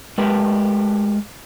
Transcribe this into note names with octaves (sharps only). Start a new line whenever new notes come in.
G#3 A3 G4 A#4 B4